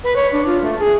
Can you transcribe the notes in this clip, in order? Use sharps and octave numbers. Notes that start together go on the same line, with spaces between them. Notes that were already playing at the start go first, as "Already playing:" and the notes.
B4
C#5
D4
F4
A3
G#4